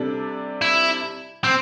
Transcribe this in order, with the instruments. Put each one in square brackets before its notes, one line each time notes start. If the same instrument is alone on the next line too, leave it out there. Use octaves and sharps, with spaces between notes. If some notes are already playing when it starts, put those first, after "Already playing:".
Already playing: [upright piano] C3 G3 D4 A4
[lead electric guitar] E4
C4